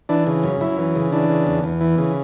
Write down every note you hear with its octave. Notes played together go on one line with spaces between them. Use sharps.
E3 D4
C#3
F#2
F#2 E4
E3
C#3
E3 D4
C#3
E2
E2
E3
C#3